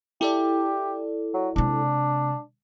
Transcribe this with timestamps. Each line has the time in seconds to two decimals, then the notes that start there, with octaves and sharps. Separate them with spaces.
0.21 E4 G4 A4 D5
1.34 F#3
1.56 C3 G#3 D4